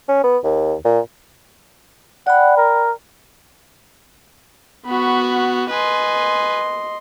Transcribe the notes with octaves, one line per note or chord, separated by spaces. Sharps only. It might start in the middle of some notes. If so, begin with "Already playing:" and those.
C#4
B3
D#2
A#2
D5 F#5 G5 B5
A#4
B3 F#4 B5 C#6
B4 D#5 G#5 C6